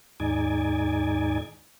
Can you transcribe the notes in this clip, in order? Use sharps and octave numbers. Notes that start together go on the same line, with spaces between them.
D#2 G#2 D#4 D5 G#5